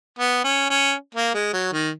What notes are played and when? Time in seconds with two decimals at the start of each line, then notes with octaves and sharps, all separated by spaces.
0.19 B3
0.44 C#4
0.70 C#4
1.15 A#3
1.34 G#3
1.53 F#3
1.73 D#3